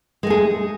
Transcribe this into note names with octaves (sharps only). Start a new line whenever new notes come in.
G#3 A3 G#4